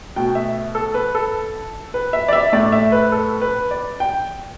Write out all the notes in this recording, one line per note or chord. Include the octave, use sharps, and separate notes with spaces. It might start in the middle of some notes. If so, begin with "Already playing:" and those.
B2 A3 G5
E5
A4
B4
A4
B4
E5
D5
E5
A2 A3 D5
E5
B4
A4
B4
D5
G5